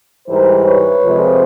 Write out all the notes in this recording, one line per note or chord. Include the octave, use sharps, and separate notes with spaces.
G#2 E3 G3 A#4 C5
B4 C#5
F2 C3 F3 G#3